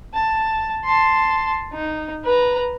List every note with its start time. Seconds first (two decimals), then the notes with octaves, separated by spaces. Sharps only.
0.14 A5
0.84 A5 C6
1.73 D#4
2.24 B4 A#5